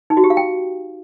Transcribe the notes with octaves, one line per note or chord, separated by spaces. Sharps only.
D#4
F#4
G4
F5
G5